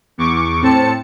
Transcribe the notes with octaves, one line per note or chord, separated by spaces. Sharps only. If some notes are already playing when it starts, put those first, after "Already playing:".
E2 C#6 D6
A2 C4 A5 C#7